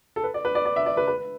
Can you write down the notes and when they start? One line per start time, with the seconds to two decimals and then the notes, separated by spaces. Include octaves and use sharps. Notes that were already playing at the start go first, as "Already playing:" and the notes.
0.16 A4
0.24 B4
0.34 D5
0.45 B4
0.55 D5
0.66 D5
0.76 E5
0.86 D5
0.97 B4
1.08 B4